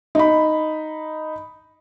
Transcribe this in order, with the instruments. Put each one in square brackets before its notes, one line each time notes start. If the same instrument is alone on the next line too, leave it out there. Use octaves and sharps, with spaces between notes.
[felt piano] D#4 B5